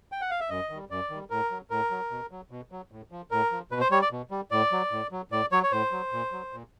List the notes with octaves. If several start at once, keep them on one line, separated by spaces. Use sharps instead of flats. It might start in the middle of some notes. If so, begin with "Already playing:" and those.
G5
F#5
F5
E5
F#2 D#5
D#3 G3
F#2 D5
D#3 G3
A2 A#4
F#3
A2 A#4
F#3
B2
F#3
B2
F#3
A2
F3
A2 A#4
F3
B2 B4
C5
G3 C#5
D5
B2
G3
A2 D5
F#3
A2
F#3
A2 D5
F#3 C#5
C#5
A2 C5
F#3
A#2
F#3
A#2